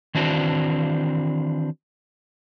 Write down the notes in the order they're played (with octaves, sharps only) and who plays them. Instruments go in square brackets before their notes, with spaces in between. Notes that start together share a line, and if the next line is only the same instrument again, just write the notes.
[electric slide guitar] D#3 E3 C4 D4 F#4